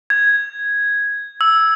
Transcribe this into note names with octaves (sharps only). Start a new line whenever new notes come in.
G#6
E6